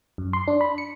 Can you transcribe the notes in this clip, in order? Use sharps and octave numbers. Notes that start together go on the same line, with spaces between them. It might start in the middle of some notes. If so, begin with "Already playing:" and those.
F#2
C6
D4
B5
C#7